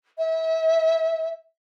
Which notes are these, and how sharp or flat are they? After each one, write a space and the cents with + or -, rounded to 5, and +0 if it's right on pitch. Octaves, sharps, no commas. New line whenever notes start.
E5 -30